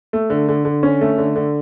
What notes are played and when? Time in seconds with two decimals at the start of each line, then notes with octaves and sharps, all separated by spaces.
0.13 A3
0.30 D3
0.48 D3
0.65 D3
0.83 C#4
1.01 A3
1.18 D3
1.36 D3